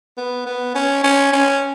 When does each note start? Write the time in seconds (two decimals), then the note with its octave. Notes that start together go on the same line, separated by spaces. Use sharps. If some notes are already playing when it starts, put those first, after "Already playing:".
0.17 B3
0.46 B3
0.75 C#4
1.04 C#4
1.33 C#4